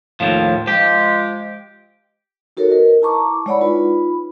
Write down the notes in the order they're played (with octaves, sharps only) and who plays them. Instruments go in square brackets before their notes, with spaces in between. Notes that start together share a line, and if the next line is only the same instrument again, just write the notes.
[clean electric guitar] D#2 A2 F3
[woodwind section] F3 G#3 [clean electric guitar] G4
[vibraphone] D#4 F#4 A4 A#4 C#5
A#4 B4 D#5
E4 A5 A#5 C#6 D6
G#3 E4 C#5 D5 F#5 B5
D#4 F4 B4 B5